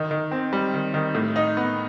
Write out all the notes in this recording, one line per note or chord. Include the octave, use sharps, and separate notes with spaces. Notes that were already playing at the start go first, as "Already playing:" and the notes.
Already playing: D#3
D#3
C4
G3
D#3
D#3
A2
D#4
B3